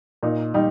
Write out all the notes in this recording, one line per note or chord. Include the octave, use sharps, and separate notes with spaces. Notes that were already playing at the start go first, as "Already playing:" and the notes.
A#2 D#4
G3 D#4